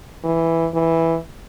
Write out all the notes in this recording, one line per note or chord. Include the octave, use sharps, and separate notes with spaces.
E3
E3